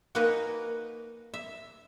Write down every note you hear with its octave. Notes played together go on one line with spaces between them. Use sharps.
A#3 D#4 F#4 A#4 B4 G#5
E5